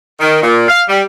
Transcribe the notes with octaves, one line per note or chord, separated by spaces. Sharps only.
D#3
A#2
F5
G3